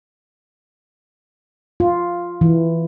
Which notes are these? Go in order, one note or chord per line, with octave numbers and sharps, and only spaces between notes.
F4
E3